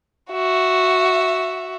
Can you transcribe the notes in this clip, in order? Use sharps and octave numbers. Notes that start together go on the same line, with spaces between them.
F#4 E5